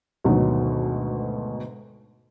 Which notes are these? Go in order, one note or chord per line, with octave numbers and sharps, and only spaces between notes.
D2 G#2 B2 D#3 F#3